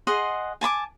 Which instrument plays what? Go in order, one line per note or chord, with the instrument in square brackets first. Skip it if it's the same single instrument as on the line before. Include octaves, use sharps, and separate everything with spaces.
[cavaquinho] G#4 D#5 F#5 C6
G#5 A5 B5 D6